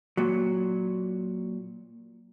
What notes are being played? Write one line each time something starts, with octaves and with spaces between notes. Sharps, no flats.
A#2 F#3